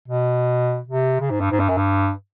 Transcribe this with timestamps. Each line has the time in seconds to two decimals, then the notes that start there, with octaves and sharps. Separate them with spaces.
0.08 B2
0.87 C3
1.21 C#3
1.30 G#2
1.41 G2
1.51 G#2
1.60 G2
1.69 F#2
1.77 G2